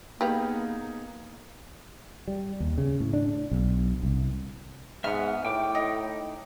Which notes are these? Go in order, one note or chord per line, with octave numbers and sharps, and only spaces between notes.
A#3 B3 D#4 G4 G#4 B4 F5
G3
D#2
C#3
A2
D4
B1
C2
G#2 B3 E5 F6
A2 G5 D6
D#4